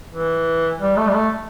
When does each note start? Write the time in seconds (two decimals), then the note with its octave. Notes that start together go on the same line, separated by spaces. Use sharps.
0.12 E3
0.80 G3
0.97 A3
1.07 G3
1.14 A3